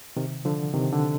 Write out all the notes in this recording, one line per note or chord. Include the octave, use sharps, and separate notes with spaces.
C3 D#3
D3 F3
C3 D#3
D3